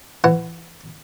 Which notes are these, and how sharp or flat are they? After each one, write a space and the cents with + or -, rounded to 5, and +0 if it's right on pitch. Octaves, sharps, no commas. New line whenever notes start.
E3 +25 F#5 +0